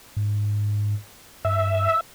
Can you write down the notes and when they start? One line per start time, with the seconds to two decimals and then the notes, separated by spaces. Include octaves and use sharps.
0.17 G#2
1.45 G2 E5